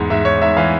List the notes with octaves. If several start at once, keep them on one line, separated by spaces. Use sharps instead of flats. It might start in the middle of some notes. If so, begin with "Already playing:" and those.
Already playing: E2 G#2
G#2 E5
G#2 C#5
G#2 E5
E3 F5